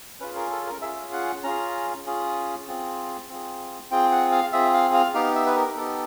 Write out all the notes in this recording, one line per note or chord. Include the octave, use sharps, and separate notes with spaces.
C#4 F4 G#4 B4
A#4
A4
A#4
C#4 F4 G#4 E5
F#5
C#4 F4 G#4 A#5
C#4 F4 G#4
C4 F4 G#4
C4 F4 G#4
C4 F4 G#4 G5
F#5
F5
C4 F4 G#4 E5
F5
F5
B3 D#4 G4 F5
E5
B4
A#4
B3 D#4 G4 A4